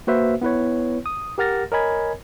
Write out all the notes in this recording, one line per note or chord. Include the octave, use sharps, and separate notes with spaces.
A#3 F#4 B4 C5 E5
B3 E4 B4 C#5
D#6
G4 A#4 F#5 F6 A6 A#6
A#4 C#5 D#5 G#5 B5 G#6